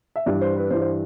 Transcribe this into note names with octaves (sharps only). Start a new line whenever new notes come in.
E5
G2 E3 G3 D5
C5
B4
G2 E3 G3 C5
C5